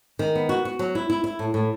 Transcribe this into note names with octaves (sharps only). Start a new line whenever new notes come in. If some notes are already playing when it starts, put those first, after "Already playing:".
D#3
B3
F#4
F#4
F#3
E4
E4
E4
A2
A2